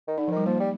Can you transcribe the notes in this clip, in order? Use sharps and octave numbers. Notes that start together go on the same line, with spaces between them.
D#3
D3 D#4
F3
D#3 G3
F3 A#3
G3